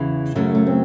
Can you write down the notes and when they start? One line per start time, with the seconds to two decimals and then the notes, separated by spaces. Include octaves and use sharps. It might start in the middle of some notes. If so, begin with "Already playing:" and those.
Already playing: E2 C#3 E3
0.35 F#2 C#3 F#3 A3 C#4
0.55 A3
0.67 C4